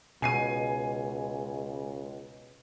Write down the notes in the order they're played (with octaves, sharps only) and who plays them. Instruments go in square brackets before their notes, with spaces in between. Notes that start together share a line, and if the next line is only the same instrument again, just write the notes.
[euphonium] C#2 [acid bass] B2 [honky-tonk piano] G#5 C7 D#7